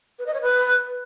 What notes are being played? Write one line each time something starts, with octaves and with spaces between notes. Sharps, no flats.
B4
D#5
C#5
B4